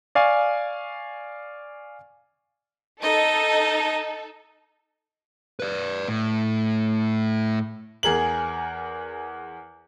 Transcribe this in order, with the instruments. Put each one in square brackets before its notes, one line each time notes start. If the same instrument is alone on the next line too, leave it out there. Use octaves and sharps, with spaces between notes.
[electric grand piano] D5 F5 G#5 C#6
[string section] D#4 A4 [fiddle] D#5
[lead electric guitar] B4 D5
A2
[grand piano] E2 G#4 A#4 F#7